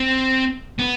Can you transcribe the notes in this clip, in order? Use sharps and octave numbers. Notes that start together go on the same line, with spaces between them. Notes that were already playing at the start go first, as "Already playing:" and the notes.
Already playing: C4
B3